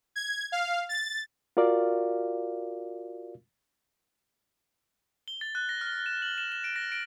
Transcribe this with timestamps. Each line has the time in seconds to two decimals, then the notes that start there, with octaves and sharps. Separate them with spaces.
0.16 G#6
0.52 F5
0.89 A6
1.57 F4 F#4 A#4 D5 F5
5.28 G7
5.41 A6
5.55 F#6
5.69 A#6
5.81 F6
6.06 E7
6.22 F#7
6.38 E7
6.52 E7
6.64 D7
6.76 A#6
6.92 D7